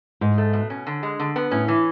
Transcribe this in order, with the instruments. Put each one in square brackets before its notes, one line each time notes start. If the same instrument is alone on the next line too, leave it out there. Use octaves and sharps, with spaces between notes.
[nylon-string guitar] G#2 [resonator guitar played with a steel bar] G#4
[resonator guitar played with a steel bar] A3
B2
C#4
D3
G#3
D3
B3
[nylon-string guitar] A2 [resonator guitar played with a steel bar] C#4
[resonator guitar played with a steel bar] E3